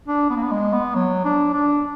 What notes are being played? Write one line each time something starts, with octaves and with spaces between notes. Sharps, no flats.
D4
B3
A#3
B3
G#3
B3
F#3
D4
D4